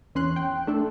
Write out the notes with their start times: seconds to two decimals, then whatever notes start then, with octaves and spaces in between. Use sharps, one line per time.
0.15 E2 C#4 C6 F#6
0.36 G5
0.67 A3 D4 A4